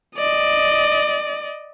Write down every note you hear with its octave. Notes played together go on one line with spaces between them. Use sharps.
D5 D#5